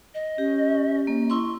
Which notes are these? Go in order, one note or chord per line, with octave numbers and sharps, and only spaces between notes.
D#5
C#4 G4
A#3
E4 C6 C#6